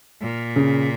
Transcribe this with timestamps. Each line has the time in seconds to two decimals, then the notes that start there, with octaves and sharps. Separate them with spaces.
0.21 A#2
0.56 C#3